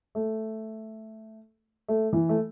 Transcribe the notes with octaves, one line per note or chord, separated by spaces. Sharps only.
A3
A3
E3
A3